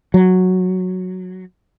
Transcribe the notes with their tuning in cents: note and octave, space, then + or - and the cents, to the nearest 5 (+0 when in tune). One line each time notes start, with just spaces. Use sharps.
F#3 -5